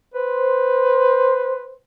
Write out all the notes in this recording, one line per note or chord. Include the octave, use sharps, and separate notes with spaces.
B4 C5